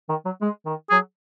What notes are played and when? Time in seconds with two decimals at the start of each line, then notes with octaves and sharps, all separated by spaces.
0.09 D#3
0.25 F#3
0.41 G#3
0.65 D#3
0.90 F#3 G#4